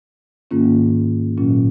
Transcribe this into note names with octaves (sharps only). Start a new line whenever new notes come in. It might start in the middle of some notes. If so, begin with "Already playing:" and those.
G#2 D#3 A#3 C#4 F4
A#2 F#3 C#4 F4